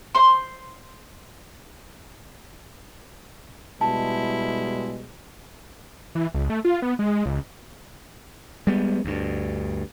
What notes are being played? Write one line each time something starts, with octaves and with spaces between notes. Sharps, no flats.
C5 C6
B2 G3 G#3 E4 A5
E3
C#2
A3
F4
B3
G#3
C#2
G3 G#3 B3
D2 G2